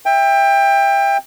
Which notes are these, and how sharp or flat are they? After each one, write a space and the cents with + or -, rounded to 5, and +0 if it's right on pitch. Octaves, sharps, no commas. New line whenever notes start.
E5 +0 G5 +25